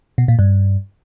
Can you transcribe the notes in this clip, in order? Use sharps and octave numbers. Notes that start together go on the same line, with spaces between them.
B2
A#2
G2